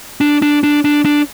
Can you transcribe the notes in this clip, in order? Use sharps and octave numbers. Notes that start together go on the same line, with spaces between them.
D4
D4
D4
D4
D4